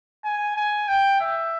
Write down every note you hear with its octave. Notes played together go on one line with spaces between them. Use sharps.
G#5
G#5
G5
E5